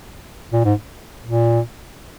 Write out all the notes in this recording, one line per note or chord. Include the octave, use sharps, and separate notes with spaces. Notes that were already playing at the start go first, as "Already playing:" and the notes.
A#2
G#2
A#2